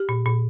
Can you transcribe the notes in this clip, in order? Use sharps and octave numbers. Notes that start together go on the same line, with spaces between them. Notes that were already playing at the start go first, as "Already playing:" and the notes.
Already playing: G4
A#2
A#2